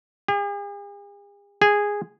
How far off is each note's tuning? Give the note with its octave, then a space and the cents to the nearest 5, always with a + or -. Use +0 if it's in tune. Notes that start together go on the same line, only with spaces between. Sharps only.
G#4 -45
G#4 -10